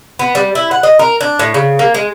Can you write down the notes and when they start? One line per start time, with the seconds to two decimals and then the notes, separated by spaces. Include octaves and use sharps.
0.19 B3
0.35 G3
0.55 E4
0.71 F#5
0.83 D#5
0.99 A#4
1.21 D4
1.39 A2
1.54 C#3
1.79 A#3
1.94 G#3